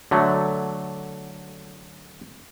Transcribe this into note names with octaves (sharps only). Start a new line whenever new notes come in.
D3 F#3 A3